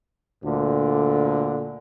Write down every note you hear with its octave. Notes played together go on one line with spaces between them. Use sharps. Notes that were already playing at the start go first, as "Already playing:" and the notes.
D2 A#2 D3